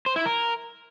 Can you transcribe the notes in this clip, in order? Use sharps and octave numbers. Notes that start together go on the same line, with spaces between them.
C5
E4
A#4